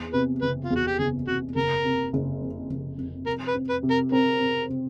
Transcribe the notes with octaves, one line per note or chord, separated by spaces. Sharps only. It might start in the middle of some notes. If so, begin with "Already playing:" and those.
Already playing: E2
C3 B4
F#1 B4
F4
E2
F#4
G4
F#1 G#4
C3 F#4
F#1 A#4
C3
F#1
F2
F#1
F2
C3 A#4
B4
C4
B4
C3
A#4
C4 A#4
C3
C3